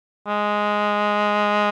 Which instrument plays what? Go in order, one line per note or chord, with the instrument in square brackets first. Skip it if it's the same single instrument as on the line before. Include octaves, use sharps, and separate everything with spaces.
[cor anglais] G#3